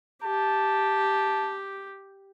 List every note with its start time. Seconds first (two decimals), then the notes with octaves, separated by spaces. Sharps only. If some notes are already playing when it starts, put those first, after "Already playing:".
0.23 G4 A5